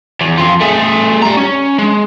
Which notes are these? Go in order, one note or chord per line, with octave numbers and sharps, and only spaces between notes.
E2
F2 F4
A3 G#4
G3 A#5
C#4
G#3